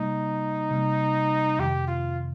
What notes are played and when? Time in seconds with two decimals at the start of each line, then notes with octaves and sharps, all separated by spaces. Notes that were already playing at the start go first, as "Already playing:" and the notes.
Already playing: C3 G3 A#3 D#4
0.71 C3 G3 A#3
1.59 F2 C3 D#3 G4
1.88 F4